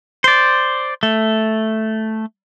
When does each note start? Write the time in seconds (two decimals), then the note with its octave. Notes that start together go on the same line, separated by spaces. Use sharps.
0.24 C5 D5
1.03 A3